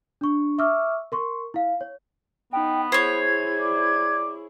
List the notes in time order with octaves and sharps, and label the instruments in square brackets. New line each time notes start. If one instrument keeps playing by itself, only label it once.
[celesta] D4 C#6
E5 C#6 D6 E6 F6
A#4 C6 C#6
E4 F5
C#5
[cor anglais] B3 [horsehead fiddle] D#4 [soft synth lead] G5
[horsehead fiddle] E4 G#4 [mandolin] C5 C#5 [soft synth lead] G#6
[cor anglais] D5